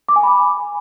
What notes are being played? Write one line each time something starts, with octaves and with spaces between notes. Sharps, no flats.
D6
G#5
B5